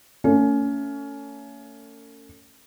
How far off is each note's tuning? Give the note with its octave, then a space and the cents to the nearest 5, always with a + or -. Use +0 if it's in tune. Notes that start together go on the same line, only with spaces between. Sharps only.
A3 +40 C#4 +20